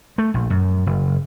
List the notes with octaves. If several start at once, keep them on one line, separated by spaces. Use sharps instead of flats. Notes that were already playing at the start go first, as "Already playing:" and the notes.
A3
A#1
F#2
F#1